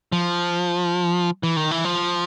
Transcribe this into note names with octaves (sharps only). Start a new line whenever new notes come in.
F3
E3
D#3
E3
F3